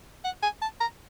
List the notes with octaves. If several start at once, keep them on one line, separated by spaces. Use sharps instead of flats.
F#5
G#5
A5
A#5